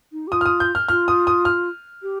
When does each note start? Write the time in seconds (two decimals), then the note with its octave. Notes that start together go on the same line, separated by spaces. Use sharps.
0.12 D#4
0.27 G4
0.32 F4 D#6
0.41 F6
0.46 D#6
0.60 G6
0.75 F6
0.88 F4 F6
1.08 D#6
1.27 D#6
1.45 F6
2.03 G4